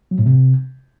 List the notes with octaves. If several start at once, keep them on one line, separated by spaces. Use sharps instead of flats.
F#3
A2
C3